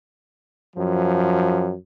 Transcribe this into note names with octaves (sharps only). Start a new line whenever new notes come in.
F#2 F3